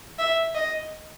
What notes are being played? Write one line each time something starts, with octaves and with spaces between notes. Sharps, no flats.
E5
D#5